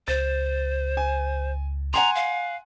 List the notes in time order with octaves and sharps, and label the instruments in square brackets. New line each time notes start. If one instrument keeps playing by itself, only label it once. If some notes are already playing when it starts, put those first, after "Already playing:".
[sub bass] C#2 [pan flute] C5 [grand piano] A6
[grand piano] G#5
[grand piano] F#5 G#5 C6 [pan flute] A#5
[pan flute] F5